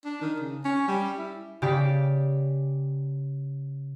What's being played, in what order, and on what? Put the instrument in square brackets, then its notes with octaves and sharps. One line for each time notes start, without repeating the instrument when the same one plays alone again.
[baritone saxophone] D4
D#3
C#3
C#4
G3
E4
[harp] C#3 G4 D5 B6